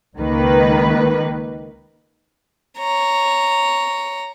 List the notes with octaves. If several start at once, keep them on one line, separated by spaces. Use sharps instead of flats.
C#2 D#3 A#3 B4
C#5 A#5